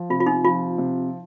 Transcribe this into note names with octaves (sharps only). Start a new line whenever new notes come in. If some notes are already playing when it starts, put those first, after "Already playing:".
Already playing: F3
C3 F4
F4
D#4
F3 F4
C3